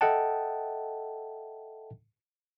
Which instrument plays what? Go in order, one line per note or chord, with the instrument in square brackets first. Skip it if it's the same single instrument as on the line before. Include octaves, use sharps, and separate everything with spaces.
[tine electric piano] A4 D#5 E5 F#5 G5 A5